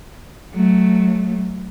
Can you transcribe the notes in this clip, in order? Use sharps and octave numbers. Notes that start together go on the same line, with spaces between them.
F#3 A3